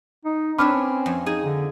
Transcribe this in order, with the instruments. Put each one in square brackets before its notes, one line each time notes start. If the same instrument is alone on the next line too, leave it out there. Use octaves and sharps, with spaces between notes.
[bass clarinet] D#4
[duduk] C4 [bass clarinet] D4 [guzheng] B4 C#5 E5 [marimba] B5 D6 F6
[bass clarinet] C#4
[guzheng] F2
[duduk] D#4 [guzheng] G#4 G#5
[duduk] D3